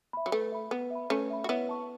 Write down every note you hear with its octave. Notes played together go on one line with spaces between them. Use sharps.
E5 B5
F#3
A3 B4
E5 B5
B3 B4
E5 B5
A3 C#4 B4
E5 B5
F#4
B3 E4 C#5
A5 C#6